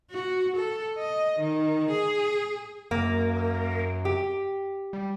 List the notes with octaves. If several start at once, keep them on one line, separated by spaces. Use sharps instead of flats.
F#4
A4
D#5
D#3
G#4
F#2 A#3
G4
G3